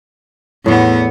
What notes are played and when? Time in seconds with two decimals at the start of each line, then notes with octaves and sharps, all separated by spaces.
0.66 E2 A2 B3